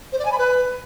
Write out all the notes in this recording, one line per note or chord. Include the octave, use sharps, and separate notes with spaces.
C5
D5
G#5
B5
B4